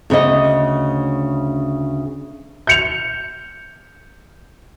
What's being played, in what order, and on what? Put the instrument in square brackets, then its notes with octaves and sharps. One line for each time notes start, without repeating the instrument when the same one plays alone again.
[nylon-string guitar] D2 C#3 C#5 D#5
[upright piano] G6 C#7 F7